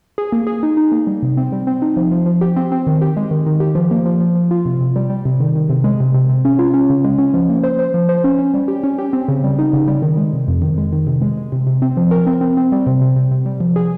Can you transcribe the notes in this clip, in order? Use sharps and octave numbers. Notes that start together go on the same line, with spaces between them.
G#4
A#3
G#4
D#4
D#4
A#3
G3
C3
C4
G3
C4
D#4
F3
F3
F3
G4
C4
C4
D#3
G4
G#3
D#3
D#3
G4
F3
A#3
F3
F3
F3
F4
C3
C3
G3
G3
C3
D#3
D#3
C3
G#3
C3
C3
C3
C#4
F4
C#4
C#3
G#3
C#4
F3
A#3
C5
C5
F3
C5
C#4
C#4
G3
G4
C#4
G4
C4
C#3
G3
D#4
C#3
G3
D#3
G#3
C3
F2
D#3
G#3
D#3
C3
G#3
G#3
C3
C3
C4
F3
A#4
C4
C4
C4
G3
C3
C3
C3
C3
G3
F3
G#4